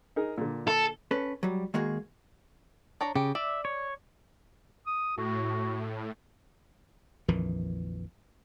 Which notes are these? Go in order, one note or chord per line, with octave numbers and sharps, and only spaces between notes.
D#4 G#4 A#4
A#2 D3
A4
C#4 A4 B4
F#3 G3
D#3 G#3 A#3 F#4 G#4
D4 C#5 A#5
C#3 G4
D5 E5
C#5
D#6
A2 F#4
A#1 F2 D#3 E3